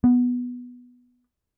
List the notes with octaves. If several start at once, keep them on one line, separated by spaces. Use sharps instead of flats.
B3